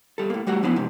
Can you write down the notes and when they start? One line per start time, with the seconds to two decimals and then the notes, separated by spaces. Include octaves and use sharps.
0.18 G3 A4
0.30 A2 A#3
0.47 G3 A3 F#4 F#5
0.63 F3 B3 D4 E4
0.76 G#2 C3 F3